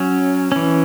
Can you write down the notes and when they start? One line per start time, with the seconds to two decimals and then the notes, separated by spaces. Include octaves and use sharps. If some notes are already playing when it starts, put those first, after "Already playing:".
Already playing: F#3 C#4
0.52 E3 C#4